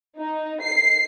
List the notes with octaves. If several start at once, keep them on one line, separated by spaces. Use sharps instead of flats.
D#4
C7